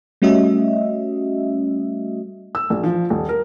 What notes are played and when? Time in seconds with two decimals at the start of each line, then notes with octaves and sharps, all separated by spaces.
0.22 G3 A3 C#4 F#4 D#5 E5
2.55 E6
2.70 A#1
2.84 F3
3.10 D#1
3.29 A#4